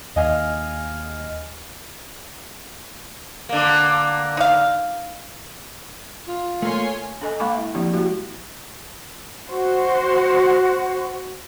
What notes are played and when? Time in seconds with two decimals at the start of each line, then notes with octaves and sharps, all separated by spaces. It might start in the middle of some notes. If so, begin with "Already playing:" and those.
0.16 D#2 D#5 F5 G#5 F6
3.49 D3 A#3
4.37 D#4 F5
6.26 F4
6.62 A3 A#3 C#5 G#5 C6
7.22 D4 A4 D#5 G#5
7.40 G#3 A#3 F5 B5 C#6 D6
7.54 E4 E5
7.75 F3 A#3 C4 D4 E4 G4
7.94 G#3 A#3 E4 F#4 G4
9.49 F#4 C5 F#5